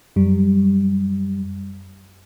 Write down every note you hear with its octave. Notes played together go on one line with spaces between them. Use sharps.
F#2 G3